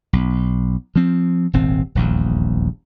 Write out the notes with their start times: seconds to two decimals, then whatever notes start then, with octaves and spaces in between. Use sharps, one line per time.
0.13 B1
0.96 F3 C4
1.53 D#1 G#1 C4
1.95 D#1 A#1 E2